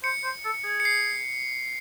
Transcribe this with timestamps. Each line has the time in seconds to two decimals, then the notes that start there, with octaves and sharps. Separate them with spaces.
0.04 C5 C#7
0.24 C5
0.45 A4
0.64 G#4
0.80 C#7
0.85 C7